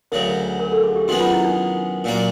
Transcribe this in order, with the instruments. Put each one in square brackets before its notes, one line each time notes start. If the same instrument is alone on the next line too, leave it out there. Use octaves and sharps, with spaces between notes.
[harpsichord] D2 C#3 F#3 [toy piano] A#4
[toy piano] A#4
A4
G#4
G4
[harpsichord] F#2 D#3 G#3 B3 [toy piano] F#4
[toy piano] F4
E4
D4
[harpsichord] A#2 F#3 A#3 D4